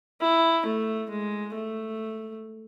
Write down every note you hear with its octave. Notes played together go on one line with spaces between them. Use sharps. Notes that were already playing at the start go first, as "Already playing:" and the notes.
E4
A3
G#3
A3